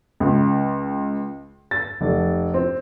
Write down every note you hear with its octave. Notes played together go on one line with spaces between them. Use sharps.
C#2
A6
F1
C4